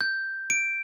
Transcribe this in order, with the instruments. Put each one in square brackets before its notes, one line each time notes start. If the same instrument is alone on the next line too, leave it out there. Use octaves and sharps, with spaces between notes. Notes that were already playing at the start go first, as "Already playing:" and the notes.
[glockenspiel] G6
D7